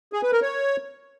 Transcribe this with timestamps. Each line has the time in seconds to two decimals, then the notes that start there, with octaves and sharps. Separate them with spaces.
0.13 G#4
0.23 B4
0.32 A#4
0.42 C#5